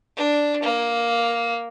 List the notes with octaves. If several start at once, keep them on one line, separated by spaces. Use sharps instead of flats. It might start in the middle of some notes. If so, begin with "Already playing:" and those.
D4
A#3